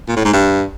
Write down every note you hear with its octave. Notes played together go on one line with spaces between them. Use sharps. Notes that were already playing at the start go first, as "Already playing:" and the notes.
A#2
A2
G#2
G2